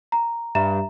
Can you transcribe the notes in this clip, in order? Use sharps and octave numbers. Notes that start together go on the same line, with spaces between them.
A#5
G2 E5 A#5 E7